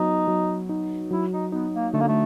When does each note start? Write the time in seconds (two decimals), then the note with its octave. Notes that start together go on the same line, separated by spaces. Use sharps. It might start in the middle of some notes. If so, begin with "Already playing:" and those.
Already playing: F#3 B3 D#4
0.28 F#3
0.69 D#4
1.11 F#3 E4
1.32 D#4
1.52 B3 D#4
1.74 A#3
1.93 D3 A3
2.00 A#3
2.08 A3